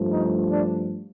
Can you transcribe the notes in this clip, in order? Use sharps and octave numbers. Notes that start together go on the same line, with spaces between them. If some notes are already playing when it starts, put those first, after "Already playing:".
Already playing: G2 F3 A3
D#4
D4